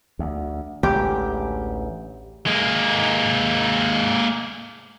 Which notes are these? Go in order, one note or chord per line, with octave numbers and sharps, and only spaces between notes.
D2
A1 D2 G#3 G4
G#3 A#3